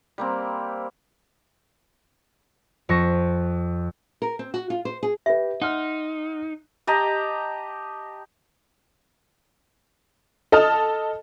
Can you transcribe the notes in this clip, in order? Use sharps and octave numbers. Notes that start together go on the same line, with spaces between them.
G3 A#3 C4
F2 C#6 A#6 E7
A#4
C4
F#4
F4
C5
G#4
G4 B4 E5
D#4 F#5 C6 F6
G4 D#5 A5 A#5
A4 D#5 A5 D#6 F6